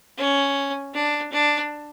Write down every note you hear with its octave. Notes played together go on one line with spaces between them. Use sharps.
C#4
D4
D4